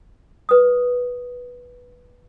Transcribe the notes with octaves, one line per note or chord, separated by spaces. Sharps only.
B4 D#6